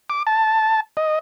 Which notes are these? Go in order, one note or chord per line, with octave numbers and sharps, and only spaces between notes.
D6
A5
D#5